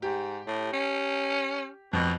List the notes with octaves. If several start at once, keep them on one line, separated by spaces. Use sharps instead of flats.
G#2 G4
A2
C#4
F2 B2